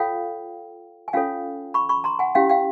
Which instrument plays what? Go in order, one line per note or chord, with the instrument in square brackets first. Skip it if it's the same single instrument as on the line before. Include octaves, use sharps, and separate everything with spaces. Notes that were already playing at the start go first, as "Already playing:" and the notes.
Already playing: [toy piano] F4 A4 C#5 F5 G5
G#5
C#4 F4 A4 C#5 F5 G5
B5 C#6
B5 C#6
A#5 C6
F#5 G#5
C#4 E4 G4 F5 G5
F5 G5